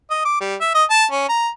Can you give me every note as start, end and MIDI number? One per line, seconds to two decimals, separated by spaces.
0.10 0.23 75
0.25 0.38 86
0.41 0.55 55
0.61 0.70 76
0.75 0.84 75
0.90 1.05 81
1.11 1.28 61
1.29 1.49 82